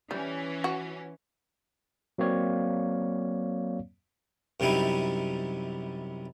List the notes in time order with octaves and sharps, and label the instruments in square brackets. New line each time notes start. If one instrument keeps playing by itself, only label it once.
[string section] E3 C#4 [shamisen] G3
[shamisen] F#4
[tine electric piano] F#3 A#3 C4 C#5 D5 F5
[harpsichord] F#2 C3 G3 D#4 E4